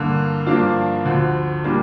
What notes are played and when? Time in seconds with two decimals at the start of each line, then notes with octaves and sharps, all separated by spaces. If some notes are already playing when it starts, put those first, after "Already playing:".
Already playing: G2 D3 A#3
0.47 G2 F3 A#3 D4 F4
1.05 D2 D3 F3
1.64 A#2 G3 A#3 D4